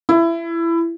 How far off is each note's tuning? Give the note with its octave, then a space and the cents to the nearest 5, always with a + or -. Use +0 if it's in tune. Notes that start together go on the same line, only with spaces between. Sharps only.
E4 +20